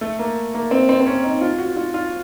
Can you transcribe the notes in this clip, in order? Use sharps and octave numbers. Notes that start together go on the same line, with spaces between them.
A3
A#3
A#3
C4
C4
C4
C#4
D#4
F4
F#4
F4
F4